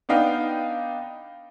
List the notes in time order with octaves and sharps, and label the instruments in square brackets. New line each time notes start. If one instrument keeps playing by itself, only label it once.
[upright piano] B3 D4 D#4 F5 G5